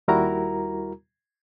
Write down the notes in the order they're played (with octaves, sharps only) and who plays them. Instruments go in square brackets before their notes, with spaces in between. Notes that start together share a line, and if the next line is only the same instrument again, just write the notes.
[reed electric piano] D#2 G3 E4 F#4 A#4 A#5